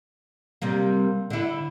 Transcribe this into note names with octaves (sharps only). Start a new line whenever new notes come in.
C3 G3 A#3
D3 E4